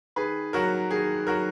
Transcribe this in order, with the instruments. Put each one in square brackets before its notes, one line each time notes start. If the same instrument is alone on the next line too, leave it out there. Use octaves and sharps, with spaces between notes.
[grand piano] D#3 G#4 B4
F#3 F#4 A#4
D#3 G#4
F#3 F#4 A#4